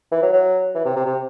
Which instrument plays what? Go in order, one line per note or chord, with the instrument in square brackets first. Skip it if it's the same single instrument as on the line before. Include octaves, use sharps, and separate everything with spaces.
[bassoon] E3
F#3
F#3
E3
C3
C3
C3